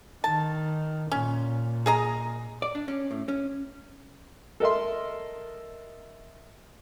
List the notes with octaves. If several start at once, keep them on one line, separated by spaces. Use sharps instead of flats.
D#3 A5
A#2 C#4
G#4 D#5 A#5
D5
D4
C#4
A2
C#4
A4 A#4 D#5 E5 C6